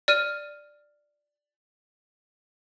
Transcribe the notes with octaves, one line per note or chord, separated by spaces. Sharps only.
D5 F6 D#7